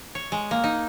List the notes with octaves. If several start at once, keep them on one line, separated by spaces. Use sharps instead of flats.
C#5
G#3
A#3
D#4